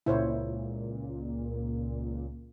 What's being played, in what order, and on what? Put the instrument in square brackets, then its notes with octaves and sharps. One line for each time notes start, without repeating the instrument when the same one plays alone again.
[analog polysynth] C#2 A#2 [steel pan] E4 C5 C#5